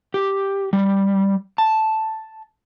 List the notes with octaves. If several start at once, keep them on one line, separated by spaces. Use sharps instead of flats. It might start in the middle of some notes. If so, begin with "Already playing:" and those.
G4
G3
A5